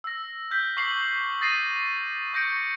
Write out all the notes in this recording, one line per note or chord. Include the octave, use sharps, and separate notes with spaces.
E6 A#6
F6 G6 B6
C#6 D6 C7 F#7
D#6 A6 A#6 C7 D#7
C#6 G6 A#6 C#7 D7